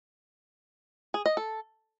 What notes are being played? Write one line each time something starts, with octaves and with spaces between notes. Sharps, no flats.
G#4
D#5
A4